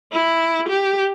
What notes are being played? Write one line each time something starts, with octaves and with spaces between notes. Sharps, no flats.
E4
G4